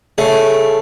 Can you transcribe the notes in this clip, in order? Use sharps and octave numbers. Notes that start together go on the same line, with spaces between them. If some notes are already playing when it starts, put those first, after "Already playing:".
C#3 A3